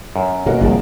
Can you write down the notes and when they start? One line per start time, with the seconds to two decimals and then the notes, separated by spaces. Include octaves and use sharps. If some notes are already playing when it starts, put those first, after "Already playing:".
0.16 F#2
0.46 B2 A#3 F#4 A#4
0.61 F#1 C2 F3 G#3 A#3